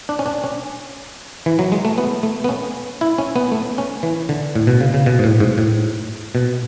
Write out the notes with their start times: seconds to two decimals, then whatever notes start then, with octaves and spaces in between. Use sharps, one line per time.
0.09 D4
0.19 C#4
0.26 D4
0.44 C#4
1.46 E3
1.59 F#3
1.72 G#3
1.85 A3
1.98 B3
2.23 A3
2.44 B3
2.49 C#4
3.01 E4
3.18 C#4
3.36 B3
3.52 A3
3.78 C#4
4.03 E3
4.29 D3
4.55 A2
4.67 B2
4.80 C#3
4.94 C#3
5.06 B2
5.19 G#2
5.24 A2
5.40 G#2
5.58 A2
6.35 B2